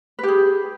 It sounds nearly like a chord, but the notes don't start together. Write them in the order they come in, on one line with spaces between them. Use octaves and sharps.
B4 G4 G#4